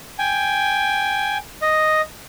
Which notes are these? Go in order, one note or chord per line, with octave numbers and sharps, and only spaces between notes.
G5 G#5
D#5